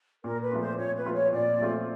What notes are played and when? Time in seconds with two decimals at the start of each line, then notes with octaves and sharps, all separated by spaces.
0.24 A#2 A#4
0.42 B4
0.52 F3 A3 C4 F4
0.61 C5
0.78 A#2 C#5
0.97 B4
1.06 F3 A3 C4 F4
1.14 C#5
1.33 A#2 D5
1.60 F3 A3 C4 F4